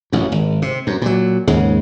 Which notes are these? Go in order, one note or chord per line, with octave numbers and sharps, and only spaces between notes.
A1 F#2
G#1
C3
F#2
A#2 F#3
D#2 G#2 C#3 G#3